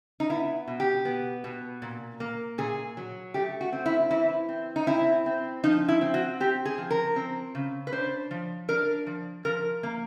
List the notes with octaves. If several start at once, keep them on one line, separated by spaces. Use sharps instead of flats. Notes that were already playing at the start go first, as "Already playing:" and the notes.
D#4
B3 E4
B2
G4
B3
B2
A#2
A#3
A#2 G#4
F#3
A3 G4
F#4
C4
E4
E3 E4
C4
D#4
C4 E4
C4
F3 D#4
E4
C4
F#4
C4 G4
G#4
F3
A#4
C4
C#3
B4
D4 C5
F3
D4 A#4
F3
F3 A#4
A#3